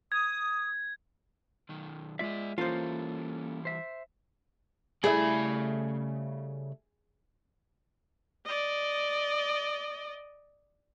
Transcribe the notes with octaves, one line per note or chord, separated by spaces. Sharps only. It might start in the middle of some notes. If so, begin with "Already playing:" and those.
D#6 G#6
B1 D#3
G#3 F4 G#4 D5 E5
E3 G3 A#3 C#4 F4 A4 C5
C5 E5
C#3 G3 A3 E4 G#4 B5
D5 D#5